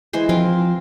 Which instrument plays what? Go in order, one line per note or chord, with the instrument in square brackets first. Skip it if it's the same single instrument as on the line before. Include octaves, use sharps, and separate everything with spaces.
[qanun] E3 G#3 C5
[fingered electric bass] F3 [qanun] C4 F4 A#4